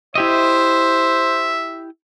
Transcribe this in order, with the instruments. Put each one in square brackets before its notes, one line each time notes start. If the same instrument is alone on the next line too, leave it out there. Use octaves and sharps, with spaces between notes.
[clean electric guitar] E4 G4 D#5 [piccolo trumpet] C5 [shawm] E5